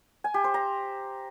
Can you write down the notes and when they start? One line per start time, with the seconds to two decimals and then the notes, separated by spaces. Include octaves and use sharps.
0.24 G#5
0.34 G4
0.44 C5
0.54 A#5